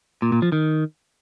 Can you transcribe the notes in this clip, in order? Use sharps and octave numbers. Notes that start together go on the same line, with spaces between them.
A#2
A#2
F3
D#3